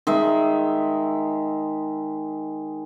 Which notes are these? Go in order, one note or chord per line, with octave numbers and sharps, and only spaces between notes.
D#3 G#3 E5